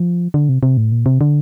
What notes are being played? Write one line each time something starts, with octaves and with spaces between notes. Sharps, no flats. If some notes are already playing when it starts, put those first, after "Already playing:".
Already playing: F3
D3
C3
C3
A2
A#2
C3
D3